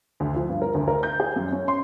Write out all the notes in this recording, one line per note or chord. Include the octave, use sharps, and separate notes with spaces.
D2
F3
G2
A#4
D2
A#4
G6
G#4
F#2
C#4
C6